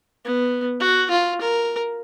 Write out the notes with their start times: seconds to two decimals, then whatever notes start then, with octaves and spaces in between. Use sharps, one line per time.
0.25 B3
0.80 F#4
1.11 F4
1.41 A#4